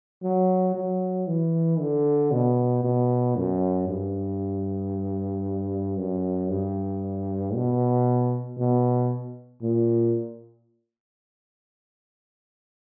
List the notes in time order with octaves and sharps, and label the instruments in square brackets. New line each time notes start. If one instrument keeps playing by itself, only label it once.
[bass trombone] F#3
F#3
E3
D3
B2
B2
F#2
G2
F#2
G2
B2
B2
A#2